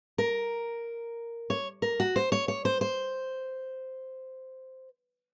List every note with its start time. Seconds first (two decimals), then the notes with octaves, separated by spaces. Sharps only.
0.18 A#4
1.50 C#5
1.82 A#4
2.00 F#4
2.16 C5
2.32 C#5
2.48 C#5
2.65 C5
2.81 C5